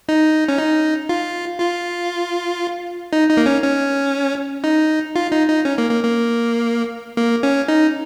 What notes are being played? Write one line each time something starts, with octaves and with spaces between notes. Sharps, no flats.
D#4
C#4
D#4
F4
F4
D#4
D#4
A#3
C#4
C#4
D#4
F4
D#4
D#4
C#4
A#3
A#3
A#3
A#3
C#4
D#4